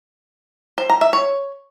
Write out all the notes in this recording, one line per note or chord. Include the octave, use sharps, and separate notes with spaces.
C5
A#5
E5
C#5